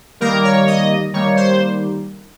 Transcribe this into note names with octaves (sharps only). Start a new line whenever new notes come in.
D#3 G3 A#3 A#4
C#5
D#5
D#3 G3 A#3 C#5
C5